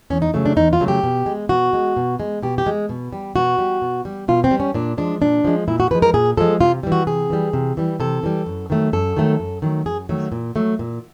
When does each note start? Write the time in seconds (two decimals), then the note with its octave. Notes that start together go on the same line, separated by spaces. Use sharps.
0.10 E2 C#4
0.22 D#4
0.34 C#3 F#3 A3
0.46 D4
0.56 E2 D#4
0.73 F4
0.80 C#3 F#3 A3
0.88 G4
1.03 B2
1.26 G#3
1.49 B2 F#4
1.73 G#3
1.97 B2
2.20 G#3
2.43 B2 G4
2.58 G4
2.66 G#3
2.89 B2
3.13 G3
3.36 B2 F#4
3.59 G3
3.82 B2
4.05 G3
4.28 B2 F4
4.44 C4
4.51 G3
4.60 C#4
4.74 A#2 D4
4.98 F3 G#3 D4
5.21 A#2 D4
5.44 F3 G#3
5.68 A#2 E4
5.80 F#4
5.91 F3 G#3 B4
6.02 A#4
6.14 A#2 G#4
6.37 F3 G#3 A4
6.60 C3 F4
6.83 E3 G3
6.92 F#4
7.07 C3 G#4
7.30 E3 G3
7.53 C3
7.77 E3 G3
8.00 C3 A4
8.23 E3 G3
8.46 F#2
8.70 D#3 F#3 A3
8.93 F#2 A4
9.17 D#3 F#3 A3
9.39 F#2
9.62 D#3 F#3 A3
9.86 F#2 G#4
10.09 D#3 F#3 A3
10.32 A#2
10.56 F#3 A3
10.79 A#2